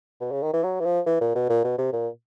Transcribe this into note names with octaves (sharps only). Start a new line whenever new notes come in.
B2
C#3
D#3
E3
F#3
E3
F3
E3
A#2
B2
A#2
B2
C3
A#2